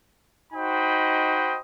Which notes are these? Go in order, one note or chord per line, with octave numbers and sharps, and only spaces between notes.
D#4 F#4 C5 D#5 G5 B5